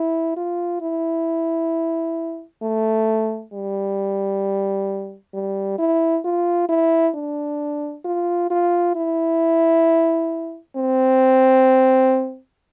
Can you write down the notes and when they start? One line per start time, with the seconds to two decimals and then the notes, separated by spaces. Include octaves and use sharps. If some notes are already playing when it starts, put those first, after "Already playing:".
Already playing: E4
0.37 F4
0.81 E4
2.62 A3
3.53 G3
5.34 G3
5.79 E4
6.24 F4
6.69 E4
7.15 D4
8.05 F4
8.50 F4
8.96 E4
10.76 C4